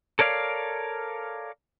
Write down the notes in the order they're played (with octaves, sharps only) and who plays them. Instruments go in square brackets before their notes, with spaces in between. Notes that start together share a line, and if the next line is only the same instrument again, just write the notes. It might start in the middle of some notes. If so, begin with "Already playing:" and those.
[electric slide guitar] A4 A#4 C#5 D5 F5